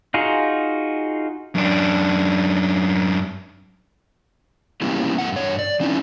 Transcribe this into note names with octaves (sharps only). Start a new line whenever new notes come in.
D#4 F4 F#4 G#4
F#2 D4
G3 A#3 B3 C#4 E4 G4
F#2 B2 A3 F#5
G2 C#5
D5
F3 C4 C#4 D#4 E4